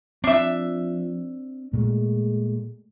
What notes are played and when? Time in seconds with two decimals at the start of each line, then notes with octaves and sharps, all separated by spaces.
0.24 F3 C4 D4 E5
1.73 A#2 G#3 A3